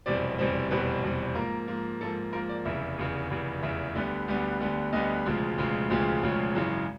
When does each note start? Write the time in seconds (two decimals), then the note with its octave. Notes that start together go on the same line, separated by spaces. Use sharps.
0.06 F1 E2 B2 G3 C4 D5
0.38 F1 E2 B2 G3 C4 C5
0.71 F1 E2 B2 G3 C4 B4
1.03 F1 E2 B2 G3 C4
1.35 G#2 F3 A#3 A#4
1.67 G#2 F3 A#3
2.01 G#2 F3 A#3 A4
2.33 G#2 F3 A#3 A#4
2.49 D5
2.65 F1 E2 C#3 E5
2.98 F1 E2 C#3
3.30 F1 E2 C#3
3.62 F1 E2 C#3 E5
3.95 D2 D3 G3 B3
4.28 D2 D3 G3 B3
4.60 D2 D3 G3 B3
4.92 D2 D3 G3 B3 D#5
5.26 E1 D2 C#3 F3 G#3
5.58 E1 D2 C#3 F3 G#3
5.90 E1 D2 C#3 F3 G#3
6.22 E1 D2 C#3 F3 G#3 C#5
6.55 G#1 F#2 C#3 E3 G#3